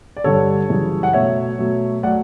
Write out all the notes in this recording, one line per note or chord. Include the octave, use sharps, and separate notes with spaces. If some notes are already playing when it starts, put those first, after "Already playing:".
D5
G2 D3 G3 A4 C#5
F#2 C#3 E3 G3
F#5
B2 F#3 A3 C#5 E5
B2 F#3 A3
F#3 A3 D5 F#5